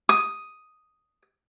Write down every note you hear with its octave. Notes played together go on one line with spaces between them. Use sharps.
D#6